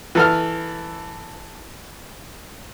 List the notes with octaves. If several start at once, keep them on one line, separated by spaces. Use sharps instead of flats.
E3 A4 F6